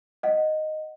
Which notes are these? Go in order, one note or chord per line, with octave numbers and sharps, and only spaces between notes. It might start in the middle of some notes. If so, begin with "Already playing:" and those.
D#5 F#5